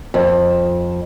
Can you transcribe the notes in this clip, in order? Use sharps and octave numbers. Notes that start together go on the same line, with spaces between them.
F2